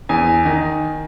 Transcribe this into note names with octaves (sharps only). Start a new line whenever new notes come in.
E2 G#5
D#3